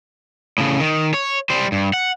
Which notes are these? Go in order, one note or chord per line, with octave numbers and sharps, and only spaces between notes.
A2 C#3
D#3
C#5
G3 C5
G2
F#5